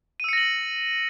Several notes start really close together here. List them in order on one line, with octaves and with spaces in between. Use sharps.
D#7 E6 C#7 A#6 F#7